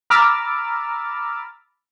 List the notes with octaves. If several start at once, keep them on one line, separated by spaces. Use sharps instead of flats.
A#5 B5 D6 E6 F6 A6